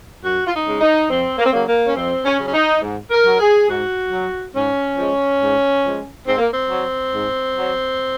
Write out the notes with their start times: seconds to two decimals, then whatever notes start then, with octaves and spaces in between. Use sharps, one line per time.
0.23 F#2 F#4
0.47 F4
0.53 D#4
0.66 C#3 G#3
0.81 D#4
1.10 F2 C4
1.39 A#3
1.46 C4
1.53 C#3 F#3 A#3
1.68 A#3
1.87 C#4
1.96 F2 C4
2.25 C#4
2.40 C#3 F#3 C#4
2.54 D#4
2.82 G#2
3.11 A#4
3.25 F#3
3.40 G#4
3.69 G#2 F#4
4.12 F#3
4.54 G#2 C#4
4.98 F3 G#3
5.41 G#2
5.84 F3 G#3
6.27 G#2 C4
6.38 A#3
6.50 C4
6.70 F#3
7.13 G#2
7.57 F#3